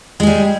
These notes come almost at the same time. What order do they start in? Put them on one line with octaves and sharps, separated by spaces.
G#3 G#4 G3